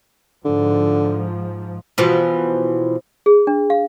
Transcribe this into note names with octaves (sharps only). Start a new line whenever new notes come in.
G#2 D3 F3
B2 E3 F3
G#4
D4
F5